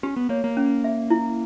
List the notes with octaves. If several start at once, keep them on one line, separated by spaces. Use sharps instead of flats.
C#4 G4
B3
A#3 C#5
A#3
C#4
E5
E4